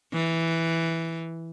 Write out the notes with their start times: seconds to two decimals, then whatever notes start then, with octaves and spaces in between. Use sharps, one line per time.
0.14 E3